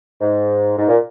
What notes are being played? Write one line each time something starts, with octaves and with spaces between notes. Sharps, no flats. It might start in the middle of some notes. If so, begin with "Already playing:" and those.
G#2
G#2
A#2